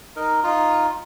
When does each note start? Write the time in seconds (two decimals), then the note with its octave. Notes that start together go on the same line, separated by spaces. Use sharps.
0.16 D#4 A#4
0.43 D#4 F4